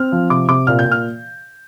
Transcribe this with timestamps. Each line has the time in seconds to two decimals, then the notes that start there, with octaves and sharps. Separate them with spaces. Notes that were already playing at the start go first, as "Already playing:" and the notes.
Already playing: C4 F6
0.12 F3
0.30 C3 D6
0.48 C3 D6
0.67 A#2 F6
0.79 G6
0.85 A#2
0.91 F6